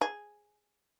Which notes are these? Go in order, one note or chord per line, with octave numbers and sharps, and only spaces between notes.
G#4